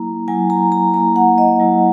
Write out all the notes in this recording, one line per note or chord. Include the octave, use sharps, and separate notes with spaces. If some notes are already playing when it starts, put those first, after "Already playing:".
Already playing: F#3 A#3 E4 A#5
F#3 A#3 E4 G#5
A#5
A#5
F#3 A#3 E4 A#5
F#5
D#5
F#3 A#3 E4